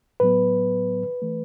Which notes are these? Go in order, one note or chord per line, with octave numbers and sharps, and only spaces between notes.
A2 F#3 B3 B4
E3 A3